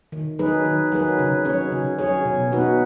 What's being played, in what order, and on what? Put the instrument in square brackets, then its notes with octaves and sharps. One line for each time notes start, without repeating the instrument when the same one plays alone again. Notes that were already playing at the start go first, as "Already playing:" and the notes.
[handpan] D#3
F#3 D#4 G#4 B4
D#3
F#3 D#4 G#4 B4
C#3
F#3 C#4 G#4 C#5
C#3
F#3 C#4 G#4 C#5
B2
B3 D#4 F#4 B4